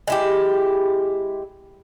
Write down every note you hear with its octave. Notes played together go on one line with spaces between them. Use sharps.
G#3 E4 G4